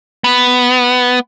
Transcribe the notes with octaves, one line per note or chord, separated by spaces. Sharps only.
B3